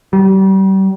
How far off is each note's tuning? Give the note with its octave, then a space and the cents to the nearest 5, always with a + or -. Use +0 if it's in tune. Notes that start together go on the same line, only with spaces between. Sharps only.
G3 -35